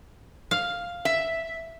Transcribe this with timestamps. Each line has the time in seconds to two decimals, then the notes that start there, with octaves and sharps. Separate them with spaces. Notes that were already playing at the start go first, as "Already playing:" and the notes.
0.51 F5
1.05 E5